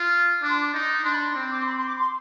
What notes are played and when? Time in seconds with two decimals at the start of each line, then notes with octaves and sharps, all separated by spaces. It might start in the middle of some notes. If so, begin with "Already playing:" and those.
Already playing: F4
0.42 D4 D6
0.49 C6
0.57 D6
0.74 D#4
1.04 D4 C6
1.12 B5
1.18 C6
1.35 C4
1.52 D6
1.59 C6
1.67 B5
1.77 C6
1.87 D6
1.98 C6